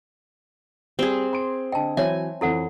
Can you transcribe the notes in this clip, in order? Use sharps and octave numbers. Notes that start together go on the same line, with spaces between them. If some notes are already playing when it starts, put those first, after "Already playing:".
G3 C4 G#4
C6 D7
D3 D#5 G5 A5
E3 F#3 C4 C#5 E5 G#5
F2 E3 E4 A4 F#5